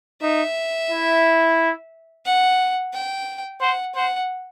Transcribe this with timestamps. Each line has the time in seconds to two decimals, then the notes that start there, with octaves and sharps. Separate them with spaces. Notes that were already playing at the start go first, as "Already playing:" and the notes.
0.22 D#4 E5
0.91 E4
2.26 F#5
2.94 G5
3.61 C5 F#5
3.95 C5 F#5